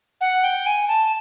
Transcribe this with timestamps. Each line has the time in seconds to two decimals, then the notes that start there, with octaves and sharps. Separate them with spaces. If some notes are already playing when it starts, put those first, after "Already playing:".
0.21 F#5
0.44 G5
0.66 G#5
0.88 A5